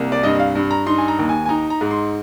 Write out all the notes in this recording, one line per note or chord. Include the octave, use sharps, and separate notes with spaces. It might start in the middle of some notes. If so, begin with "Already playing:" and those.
Already playing: C2 A#3
D5
G2 D#5
F5
G2
A#5
D#4 C6
G#5
A#5
D#2
G#5
G#5
D#4 A#5
A#5
G#2
C6